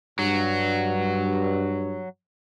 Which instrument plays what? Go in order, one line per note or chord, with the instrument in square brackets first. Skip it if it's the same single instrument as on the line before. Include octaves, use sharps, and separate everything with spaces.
[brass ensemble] G2 [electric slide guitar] F#3